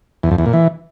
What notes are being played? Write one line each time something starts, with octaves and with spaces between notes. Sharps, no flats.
E2
F2
E2
A#2
E3